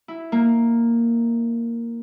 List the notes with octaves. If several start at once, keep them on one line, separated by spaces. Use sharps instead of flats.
E4
A#3